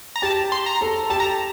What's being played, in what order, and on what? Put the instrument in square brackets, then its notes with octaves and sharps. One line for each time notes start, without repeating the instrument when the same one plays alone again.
[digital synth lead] A#5
[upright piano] G4 [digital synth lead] A5
[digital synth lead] C6
A#5
[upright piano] A4
[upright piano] G4 [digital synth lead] A5
[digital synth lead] A#5